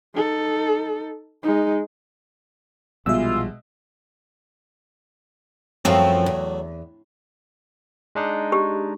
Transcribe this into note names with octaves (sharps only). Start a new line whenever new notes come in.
D#4 A4
G#3 D#4
A#1 B2 E3 G3 G#3 F4 E5 E6
F#2 F3 F#3 A3 C4
E2
G#3 D4 D#4
G4